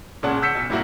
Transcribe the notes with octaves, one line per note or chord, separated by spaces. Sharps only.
A#2 C#3 G#3 C#5 F#5 A5
E6 G6 B6 C#7 E7
B1
A2 C3 G3 A#3 E4 F#4